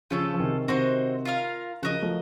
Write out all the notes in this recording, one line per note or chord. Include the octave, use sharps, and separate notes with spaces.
C#3 F3 A3 C#4 F4 A4
F3
C3 D#3
C3 D#3 C4 D#4 F#4 C5
F4 A#4 F5
C#3 F3 F#4 A#4 D#5
F3 A3